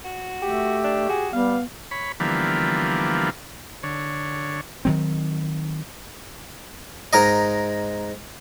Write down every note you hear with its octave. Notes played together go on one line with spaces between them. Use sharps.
F#4
A3 G4
D4
F#4 G#4
G3 B3 F5
C#5 B5
D3 E3 F3 G3 A#3 B3
D3 C#5
D#3 F#3 C4
G#2 A#4 D#5